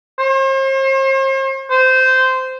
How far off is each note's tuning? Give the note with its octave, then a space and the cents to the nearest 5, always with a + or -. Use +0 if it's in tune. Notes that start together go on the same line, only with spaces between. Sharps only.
C5 +40
C5 -15